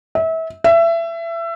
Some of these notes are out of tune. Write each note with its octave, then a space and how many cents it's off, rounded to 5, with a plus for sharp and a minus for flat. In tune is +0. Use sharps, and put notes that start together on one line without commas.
E5 -30
E5 +25